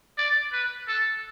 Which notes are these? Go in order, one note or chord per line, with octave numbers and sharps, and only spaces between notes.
D5
B4
A4